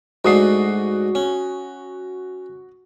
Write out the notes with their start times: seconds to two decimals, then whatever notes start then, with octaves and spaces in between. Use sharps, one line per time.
0.25 G#2 A3 D4 F#4 D#6 C7
1.15 C#4